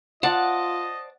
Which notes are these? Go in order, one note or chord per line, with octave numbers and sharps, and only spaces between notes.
F4 C5 D5 D#5 F#5 A5